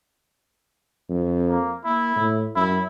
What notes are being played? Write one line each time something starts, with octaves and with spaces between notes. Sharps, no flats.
F2
A#3
A#3 E4
A2
F#2 E4